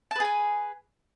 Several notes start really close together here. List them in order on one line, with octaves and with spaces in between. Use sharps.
A5 B4 G#4 G#5